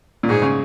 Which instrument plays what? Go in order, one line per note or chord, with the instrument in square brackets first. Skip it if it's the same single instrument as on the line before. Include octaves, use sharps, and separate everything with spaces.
[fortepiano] A#2
[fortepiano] G#2 [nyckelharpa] G#4
[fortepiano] C#3